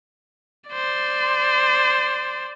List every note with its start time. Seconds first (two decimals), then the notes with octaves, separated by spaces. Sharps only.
0.70 C5 D5